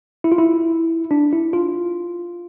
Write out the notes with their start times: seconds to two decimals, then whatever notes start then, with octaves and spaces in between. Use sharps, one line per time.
0.24 E4
0.32 F4
0.38 E4
1.11 D4
1.33 E4
1.53 F4